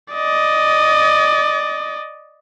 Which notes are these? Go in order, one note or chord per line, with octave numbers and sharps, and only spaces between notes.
D5 D#5